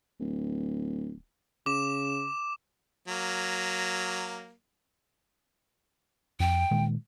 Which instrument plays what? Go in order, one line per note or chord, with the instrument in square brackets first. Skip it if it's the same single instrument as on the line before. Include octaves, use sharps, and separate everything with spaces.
[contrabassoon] D1
[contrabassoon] C#3 [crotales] D6 E7
[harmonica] F#3 A#3
[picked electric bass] F2 [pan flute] G5
[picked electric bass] A#2 D#3 G#3